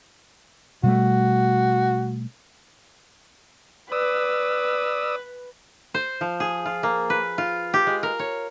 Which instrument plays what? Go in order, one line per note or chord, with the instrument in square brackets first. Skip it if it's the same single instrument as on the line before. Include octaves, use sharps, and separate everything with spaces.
[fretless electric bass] B2 G3 A3 [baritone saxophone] F#4
[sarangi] B4 [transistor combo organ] D5 D#6 E6
[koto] C5
F3
G#4
F4
A#3
B4
F4
G4
G#3
A#4
C#5